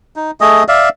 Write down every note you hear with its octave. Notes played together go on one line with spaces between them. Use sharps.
D#4
A3 G#4 D#5
D5 E5 F5